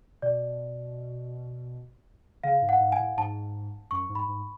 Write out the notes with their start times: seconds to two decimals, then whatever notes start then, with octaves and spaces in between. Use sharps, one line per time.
0.22 B2 D5
2.44 C#3 F5
2.62 G#2
2.69 F#5
2.80 G#2
2.92 G#5
2.99 A2
3.17 G#2 A5
3.91 F#2 C#6
4.09 G#2
4.15 B5
4.28 G#2